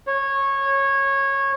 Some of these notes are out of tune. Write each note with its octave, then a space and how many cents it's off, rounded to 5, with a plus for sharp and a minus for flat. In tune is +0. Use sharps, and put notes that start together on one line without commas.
C#5 -15